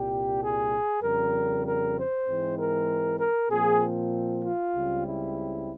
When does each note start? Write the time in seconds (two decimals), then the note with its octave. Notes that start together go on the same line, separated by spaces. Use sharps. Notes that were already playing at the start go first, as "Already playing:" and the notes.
Already playing: C2 A#2 G3 G4
0.41 G#4
1.02 F2 C#3 G3 A#4
1.65 A#4
1.96 C5
2.27 G#2 E3 G#3 C4
2.57 A#4
3.19 A#4
3.50 A#2 F3 C4 G#4
4.43 F4
4.74 C#2 C#3 G3 C4
5.05 E4